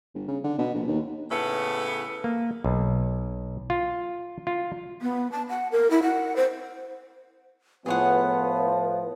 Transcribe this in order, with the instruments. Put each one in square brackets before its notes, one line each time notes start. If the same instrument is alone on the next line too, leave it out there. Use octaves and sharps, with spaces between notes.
[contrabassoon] G1
C#3
D3
B2
A#1
D#2
[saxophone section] A2 C#3 B3 E4 A4
[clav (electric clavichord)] A#3
B1
F4
F4
[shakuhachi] B3
A5
F#5
A#4
E4
F#5
C5
[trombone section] A2 F3 [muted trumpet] B3 [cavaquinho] G#4 C#5 F#5 [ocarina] B4